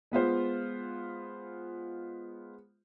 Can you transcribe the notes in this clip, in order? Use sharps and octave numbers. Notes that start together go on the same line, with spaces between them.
G#3 B3 F4 C5